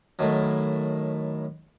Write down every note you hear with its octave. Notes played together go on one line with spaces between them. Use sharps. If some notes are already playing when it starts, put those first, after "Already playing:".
A2 D#3 F#3